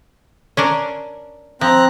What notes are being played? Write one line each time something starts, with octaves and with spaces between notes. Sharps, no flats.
C#4 D4 A#4
F3 C4 A#5 F#6